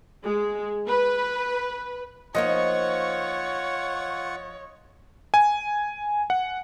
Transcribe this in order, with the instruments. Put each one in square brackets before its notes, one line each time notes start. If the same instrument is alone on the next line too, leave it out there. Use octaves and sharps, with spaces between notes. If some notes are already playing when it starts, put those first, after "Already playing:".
[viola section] G#3
B4
[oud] F3 A#3 D#4 [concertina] F4 F#5 C#6 [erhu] C#5 [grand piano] D#5
[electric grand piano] G#5
F#5